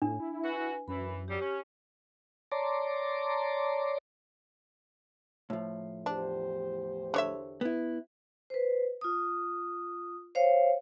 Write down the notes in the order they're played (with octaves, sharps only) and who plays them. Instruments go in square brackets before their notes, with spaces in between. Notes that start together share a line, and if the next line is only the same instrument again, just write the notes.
[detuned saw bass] A2 [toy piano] D4
[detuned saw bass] E4
[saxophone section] F#4 [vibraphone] B4 G#5
[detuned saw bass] F#2 [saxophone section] E3 [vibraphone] B5
[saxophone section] G#2 F#3 G3 [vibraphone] G4
[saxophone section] C#4
[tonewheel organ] C#5 D5 A5 A#5 C6 D6
[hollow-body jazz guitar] A2 F3
[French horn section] E2 G4 C5 [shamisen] D4
[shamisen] D3 C#5 E5
[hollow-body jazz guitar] B3 E4
[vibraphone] B4 C5
F4 D#6
C5 C#5 F5